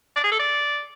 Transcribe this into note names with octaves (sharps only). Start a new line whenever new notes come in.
D5
G#4
A4
D5